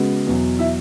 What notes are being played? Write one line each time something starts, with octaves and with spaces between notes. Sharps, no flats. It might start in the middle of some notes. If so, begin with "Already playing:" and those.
Already playing: C#3 G#3 B3 F#4
E2 B2 F#3
E4 E5